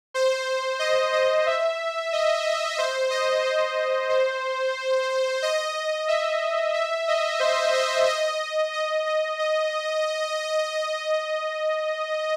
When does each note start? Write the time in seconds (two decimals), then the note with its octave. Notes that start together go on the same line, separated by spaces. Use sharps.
0.14 C5
0.79 D#5
1.13 D#5
1.46 E5
2.13 D#5
2.78 C5
3.10 D#5
3.44 C5
4.09 C5
5.42 D#5
6.08 E5
6.74 E5
7.08 D#5
7.40 C5
7.74 D#5
8.07 D#5
8.73 D#5
9.06 D#5
9.39 D#5